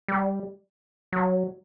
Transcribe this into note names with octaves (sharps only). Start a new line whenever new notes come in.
G3
F#3